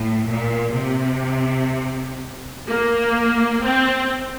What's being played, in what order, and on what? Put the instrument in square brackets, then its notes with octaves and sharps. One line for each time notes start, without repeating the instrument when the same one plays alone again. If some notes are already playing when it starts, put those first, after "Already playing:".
Already playing: [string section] A2
A#2
C3
A#3
C4